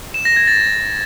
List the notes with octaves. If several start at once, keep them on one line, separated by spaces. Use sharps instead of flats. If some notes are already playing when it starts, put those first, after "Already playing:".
E7
A#6
G#6
A6